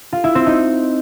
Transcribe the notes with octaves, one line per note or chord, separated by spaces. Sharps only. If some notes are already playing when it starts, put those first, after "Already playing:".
F4
E4
C4
D#4